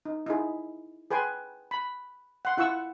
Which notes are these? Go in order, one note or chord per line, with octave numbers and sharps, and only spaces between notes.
D#4
D#4 E4 G#4
G#4 B4 G5 G#5 C6
B5
F#5 C6
E4 F4 F#5 C#6 E6